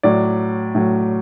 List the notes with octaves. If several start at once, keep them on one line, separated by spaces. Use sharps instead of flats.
A2 F#3 D5
A2 F#3